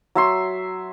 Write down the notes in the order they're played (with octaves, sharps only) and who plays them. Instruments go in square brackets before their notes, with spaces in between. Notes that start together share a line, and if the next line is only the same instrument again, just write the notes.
[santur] F#3 E5 C6